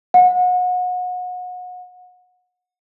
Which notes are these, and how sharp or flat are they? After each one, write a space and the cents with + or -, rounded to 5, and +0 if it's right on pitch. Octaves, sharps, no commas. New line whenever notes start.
F#5 -30